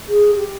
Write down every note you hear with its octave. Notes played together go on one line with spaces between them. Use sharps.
G#4
G4